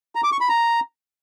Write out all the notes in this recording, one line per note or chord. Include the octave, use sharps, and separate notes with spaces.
A#5
D6
C#6
B5
A#5